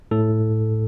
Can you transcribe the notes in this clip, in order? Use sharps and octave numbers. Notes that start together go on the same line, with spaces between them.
A2 A4